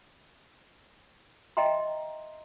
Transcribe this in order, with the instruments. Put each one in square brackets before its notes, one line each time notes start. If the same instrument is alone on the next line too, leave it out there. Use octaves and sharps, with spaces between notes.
[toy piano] D#5 E5 G5 A#5 C6